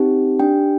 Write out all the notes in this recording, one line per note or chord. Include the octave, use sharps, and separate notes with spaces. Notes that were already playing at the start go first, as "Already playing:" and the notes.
Already playing: C4 D#4 G4
D4 G4 G5